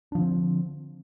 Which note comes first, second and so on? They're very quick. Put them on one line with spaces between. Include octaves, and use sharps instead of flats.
D4 F3 D3 C4